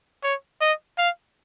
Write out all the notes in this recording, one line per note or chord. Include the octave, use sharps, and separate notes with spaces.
C#5
D#5
F5